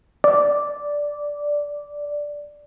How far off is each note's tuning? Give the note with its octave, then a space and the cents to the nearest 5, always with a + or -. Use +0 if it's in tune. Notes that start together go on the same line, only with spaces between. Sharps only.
D5 -5